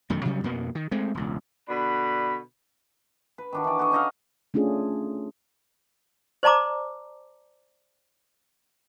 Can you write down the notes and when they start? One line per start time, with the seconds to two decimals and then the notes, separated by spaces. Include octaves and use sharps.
0.10 E1 F#2 D#3 A3
0.25 C3 F#3 G3 C#4
0.44 F2 B2 A#3 B3
0.75 D#3
0.91 G#3 A3 C4
1.14 E1 C#2
1.68 B2 D3 D4 B5
3.38 B4
3.52 D#3 D4 F#4
3.64 E3 D5
3.79 F#4 A4 D#5
3.91 C#4 D#4 D#5 F5
4.54 A3 C#4 D4 F4 G#4
6.43 C5 D5 A5 A#5 D6